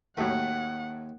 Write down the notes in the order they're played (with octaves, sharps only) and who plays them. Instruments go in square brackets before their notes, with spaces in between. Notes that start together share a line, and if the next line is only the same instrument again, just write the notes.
[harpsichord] D#2 [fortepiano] A2 F#3 A3 [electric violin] F#5